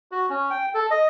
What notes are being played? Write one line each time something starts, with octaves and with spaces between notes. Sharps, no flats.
F#4
C#4
G5
A4
D#5